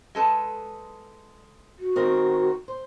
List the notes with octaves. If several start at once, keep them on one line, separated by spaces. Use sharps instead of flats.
G#3 A4 B4
F#4
D#3 C4 A#4
C5